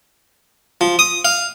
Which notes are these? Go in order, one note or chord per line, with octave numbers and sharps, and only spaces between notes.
F3
D#6
F5